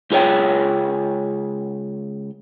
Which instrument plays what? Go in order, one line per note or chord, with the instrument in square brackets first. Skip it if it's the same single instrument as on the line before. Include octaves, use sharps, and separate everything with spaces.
[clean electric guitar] C#2 F4 G#4 C#5 G5